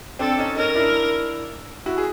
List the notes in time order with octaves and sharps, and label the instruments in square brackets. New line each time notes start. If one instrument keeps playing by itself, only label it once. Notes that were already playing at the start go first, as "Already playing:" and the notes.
[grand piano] C4 D4 [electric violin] A4
[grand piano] C#4 D#4
[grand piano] C#4 D#4 [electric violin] A#4
[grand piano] D4 E4
E4 F#4
G#4